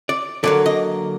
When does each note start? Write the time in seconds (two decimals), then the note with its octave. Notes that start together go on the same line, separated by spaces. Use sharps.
0.09 D5
0.44 D3 F#3 A#3 D5
0.66 D#5